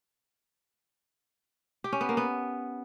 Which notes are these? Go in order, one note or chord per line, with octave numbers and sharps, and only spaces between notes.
G4
C#4
B3
A#3
B3